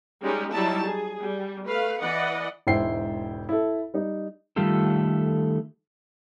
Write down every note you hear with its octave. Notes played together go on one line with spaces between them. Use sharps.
G3 G#3 C#4 D#4 G4
F#3 G3 D#4 E4 A5
G#4
G3
A3 B4 F5
E3 B4 D5 D#5 F#5
E1 G#2 E4 C5 G5 C7
E4 A4
G3 D#4
D#3 G3 A3 F4 G4 A4